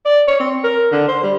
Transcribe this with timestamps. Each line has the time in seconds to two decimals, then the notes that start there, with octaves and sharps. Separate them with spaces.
0.05 D5
0.28 C#5
0.40 C4
0.64 A#4
0.92 D3
1.08 C5
1.23 G3